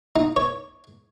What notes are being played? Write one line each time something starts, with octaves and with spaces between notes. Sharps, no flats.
D#4
C#5